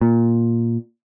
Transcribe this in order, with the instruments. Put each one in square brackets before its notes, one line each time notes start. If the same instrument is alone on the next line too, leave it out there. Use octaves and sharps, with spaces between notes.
[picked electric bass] A#2